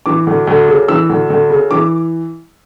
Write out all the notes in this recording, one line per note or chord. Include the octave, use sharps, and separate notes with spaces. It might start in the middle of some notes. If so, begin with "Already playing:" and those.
E3 D6
D2
D2
C#3
E3 E6
D2
D2
C#3
E3 D6